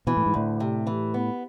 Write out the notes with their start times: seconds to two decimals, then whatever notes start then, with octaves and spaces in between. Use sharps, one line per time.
0.07 B2 E3
0.17 A2
0.26 G#2
0.34 D2 A2
0.60 C3
0.87 E3
1.14 B3